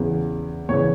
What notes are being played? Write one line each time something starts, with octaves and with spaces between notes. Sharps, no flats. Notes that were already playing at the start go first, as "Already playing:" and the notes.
Already playing: E2 C#3 E3
E2 C#3 E3 C#5